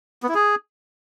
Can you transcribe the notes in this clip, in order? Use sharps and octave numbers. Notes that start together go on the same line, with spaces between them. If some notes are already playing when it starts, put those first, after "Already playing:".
B3
E4
G#4